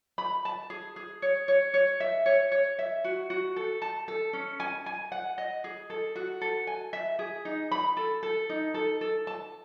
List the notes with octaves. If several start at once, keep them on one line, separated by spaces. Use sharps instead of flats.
B5
A5
G#4
G#4
C#5
C#5
C#5
E5
C#5
C#5
E5
F#4
F#4
A4
A5
A4
C#4
G#5
G#5
F#5
D#5
G#4
A4
F#4
A4
G#5
E5
G#4
D#4
B5
A4
A4
D#4
A4
A4
A5